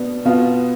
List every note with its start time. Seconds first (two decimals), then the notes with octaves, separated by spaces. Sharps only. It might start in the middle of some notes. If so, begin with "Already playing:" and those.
Already playing: B2 B3 D4
0.25 B2 B3 F4